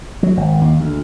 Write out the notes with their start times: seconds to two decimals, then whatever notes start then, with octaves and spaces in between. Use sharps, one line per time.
0.23 F#3
0.37 G#1
0.61 D#2
0.80 D2